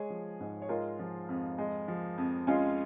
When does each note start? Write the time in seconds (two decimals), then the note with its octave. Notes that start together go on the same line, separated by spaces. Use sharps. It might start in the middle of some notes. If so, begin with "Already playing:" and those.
Already playing: G#3 G#4 C#5
0.10 F3
0.40 G#2
0.62 C#5
0.69 G#3 F4 A#4
0.99 F3
1.29 F2
1.58 G#3
1.88 F3
2.18 F2
2.47 G#3 C#4 F4